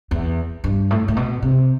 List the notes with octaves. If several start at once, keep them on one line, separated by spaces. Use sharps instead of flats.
E2
G2
A2
A2
B2
C3